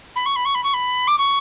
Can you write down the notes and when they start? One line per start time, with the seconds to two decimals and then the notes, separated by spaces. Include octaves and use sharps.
0.16 B5
0.26 C#6
0.36 B5
0.45 C#6
0.55 B5
0.64 C#6
0.74 B5
1.08 D6
1.18 C#6